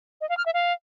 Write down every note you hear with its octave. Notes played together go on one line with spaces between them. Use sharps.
D#5
F5
F6
E5
F5